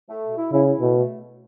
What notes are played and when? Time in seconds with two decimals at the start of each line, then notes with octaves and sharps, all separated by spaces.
0.08 A3
0.23 B2
0.37 E4
0.52 C#3 E4
0.67 E4
0.81 B2 A3
0.97 A3